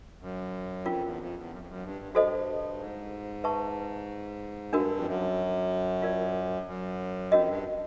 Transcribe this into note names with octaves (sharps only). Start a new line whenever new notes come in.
F#2
F2 C#4 F4 A#4
E2
F2
E2
F#2
F2
F#2
G2
F#2
G2 F#4 A4 C5 D#5
G#2
B4 E5 A5 C#6
G2 D4 F#4 A#4
F2
F#2
F4 A#4 D5
F#2
F2 C#4 F#4 A#4 D#5
G2